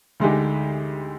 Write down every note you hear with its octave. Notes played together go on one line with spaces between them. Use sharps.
D2 D3 G#3 D#4 G4